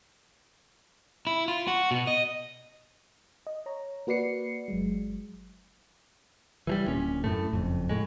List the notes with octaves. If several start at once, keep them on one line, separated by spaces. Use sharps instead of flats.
E4
F4
F#4
B2
D#5
D#5
C#5 A#5
A#3 F#4 B4 D5 C7 C#7
G1 F#3 G#3
E3 F3 G3
D1 A#2 C#4
F#2 A2 A3
F#1 F2
A2 G#3